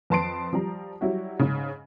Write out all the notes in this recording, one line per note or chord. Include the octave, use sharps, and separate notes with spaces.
F2 B4 A5 C6 C7 D7
F3 G3 A#5
F#3 G3 E4 F#4
G#2 C#3